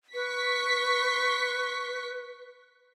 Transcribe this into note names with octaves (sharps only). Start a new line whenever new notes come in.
B4 C#6 B6